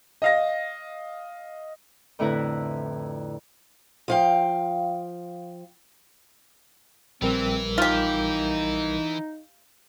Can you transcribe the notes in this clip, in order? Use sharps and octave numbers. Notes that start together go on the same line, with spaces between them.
D#5 F5 A#6
F2 A2 D3 E4 B4 A#5
F3 F5 G5
A#1 E3 G3 C4 A#4
D#4 F4 G4